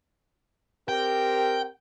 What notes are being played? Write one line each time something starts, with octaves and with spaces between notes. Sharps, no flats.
C4 G4 A#4 G5